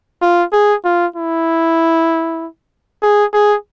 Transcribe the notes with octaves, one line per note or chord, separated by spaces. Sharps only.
F4
G#4
F4
E4
G#4
G#4